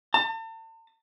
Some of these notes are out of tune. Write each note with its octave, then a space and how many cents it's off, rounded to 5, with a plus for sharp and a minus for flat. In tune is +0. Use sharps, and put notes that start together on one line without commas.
A5 +40